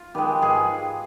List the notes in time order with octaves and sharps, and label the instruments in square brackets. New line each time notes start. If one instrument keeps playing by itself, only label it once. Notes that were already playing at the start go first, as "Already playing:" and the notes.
Already playing: [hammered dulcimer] F4
D#3 G#3 G4 B4
G#2 F4 G#4